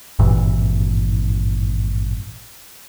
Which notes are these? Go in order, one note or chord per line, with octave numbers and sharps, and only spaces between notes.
G#1 G2 A#2 E3